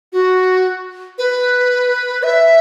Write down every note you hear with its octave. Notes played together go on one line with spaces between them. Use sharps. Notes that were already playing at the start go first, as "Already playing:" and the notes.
F#4
B4
E5